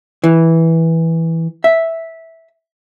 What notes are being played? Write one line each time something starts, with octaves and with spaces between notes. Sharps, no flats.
E3
E5